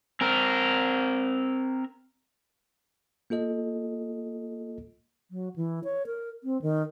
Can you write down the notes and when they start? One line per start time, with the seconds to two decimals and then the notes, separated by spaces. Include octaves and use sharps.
0.21 C4 A#4
3.30 A#3 F4 A4 D#5
5.29 F#3
5.56 E3
5.84 C#5
6.06 A#4
6.44 C4
6.62 D#3